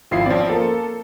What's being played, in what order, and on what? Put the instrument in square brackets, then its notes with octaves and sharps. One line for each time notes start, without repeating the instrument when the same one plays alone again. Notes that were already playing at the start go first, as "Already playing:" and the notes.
[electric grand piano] G#1 E4 [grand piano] F3 F4 C7
[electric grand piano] F3 D5 [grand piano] C4 C#4
[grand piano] A#3 [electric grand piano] A4